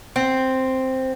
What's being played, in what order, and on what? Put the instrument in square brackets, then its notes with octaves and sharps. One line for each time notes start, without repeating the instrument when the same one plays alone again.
[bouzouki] C4